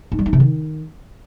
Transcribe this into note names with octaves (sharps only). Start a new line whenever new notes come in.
D#4
G3
D#4
C3
D#3